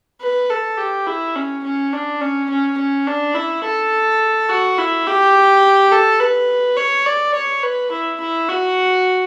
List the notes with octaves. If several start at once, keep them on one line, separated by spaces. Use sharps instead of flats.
B4
A4
G4
E4
C#4
C#4
D4
C#4
C#4
C#4
D4
E4
A4
F#4
E4
G4
A4
B4
C#5
D5
C#5
B4
E4
E4
F#4